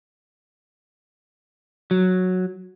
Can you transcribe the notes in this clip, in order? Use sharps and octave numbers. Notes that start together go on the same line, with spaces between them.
F#3